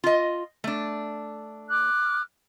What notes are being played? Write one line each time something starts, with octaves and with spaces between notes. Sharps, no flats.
F4 D#5
A3 D4
D6 F6 F#6